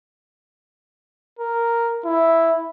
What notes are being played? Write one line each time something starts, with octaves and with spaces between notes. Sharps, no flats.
A#4
E4